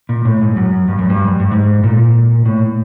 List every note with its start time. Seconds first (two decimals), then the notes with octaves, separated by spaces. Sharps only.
0.09 A#2
0.25 A2
0.41 G#2
0.56 F#2
0.88 G2
0.99 F#2
1.10 G2
1.28 F#2
1.40 G2
1.51 G#2
1.84 A#2
2.46 A2